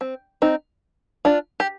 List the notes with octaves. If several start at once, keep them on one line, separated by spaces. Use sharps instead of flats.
C4
C4 D#4
D4 F4
G4